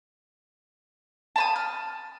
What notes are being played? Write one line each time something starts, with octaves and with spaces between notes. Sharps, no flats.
A5 B5 D#6
F6